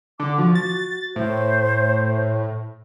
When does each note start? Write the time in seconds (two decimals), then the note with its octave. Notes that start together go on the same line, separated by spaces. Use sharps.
0.20 D3 D6
0.38 F3 F#4
0.55 A6
1.16 A2 C5